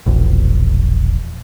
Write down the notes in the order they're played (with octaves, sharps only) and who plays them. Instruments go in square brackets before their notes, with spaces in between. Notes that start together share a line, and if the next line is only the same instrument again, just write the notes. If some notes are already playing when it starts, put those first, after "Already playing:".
[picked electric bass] E1 A#1